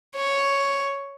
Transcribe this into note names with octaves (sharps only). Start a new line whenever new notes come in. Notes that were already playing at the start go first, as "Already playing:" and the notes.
C#5